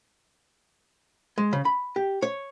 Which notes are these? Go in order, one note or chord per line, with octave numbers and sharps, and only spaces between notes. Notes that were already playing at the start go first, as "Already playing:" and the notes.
G#3
C#3
B5
G4
C#5